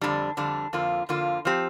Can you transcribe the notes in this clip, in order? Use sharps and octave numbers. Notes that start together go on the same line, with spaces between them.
F2 D3 G3 D4
F2 D3 G3 D4
F2 D3 A#3 F4
F2 D3 A#3 F4
F3 C4 G4